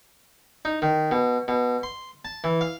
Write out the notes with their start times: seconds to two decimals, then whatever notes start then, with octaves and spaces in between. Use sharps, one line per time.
0.65 D#4
0.82 D#3
1.11 B2
1.48 B2
1.83 C6
2.25 A5
2.44 E3
2.61 F5